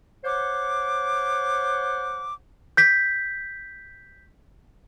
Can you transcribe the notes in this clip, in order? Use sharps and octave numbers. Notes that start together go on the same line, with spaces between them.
C5 C#5 F#5 D6
G6 B6